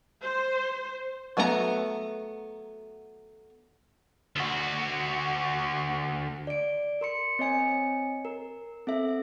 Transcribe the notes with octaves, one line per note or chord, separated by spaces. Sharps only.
C5
F#3 A3 B3 D4 A#5
D2 F#4
D5 D7
A#4 C6 C#7
C4 C#5 D#5 G#5 C#7
A#4
C4 A4 E5